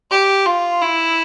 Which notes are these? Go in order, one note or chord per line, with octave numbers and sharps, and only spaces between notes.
G4
F4
E4